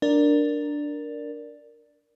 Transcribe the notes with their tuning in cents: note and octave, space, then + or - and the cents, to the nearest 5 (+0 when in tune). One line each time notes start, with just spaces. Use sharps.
D4 +0 A#4 +0 D5 +0